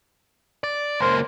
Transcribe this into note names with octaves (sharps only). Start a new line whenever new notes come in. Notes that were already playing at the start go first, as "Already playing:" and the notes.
D5
C#2 A#3 C5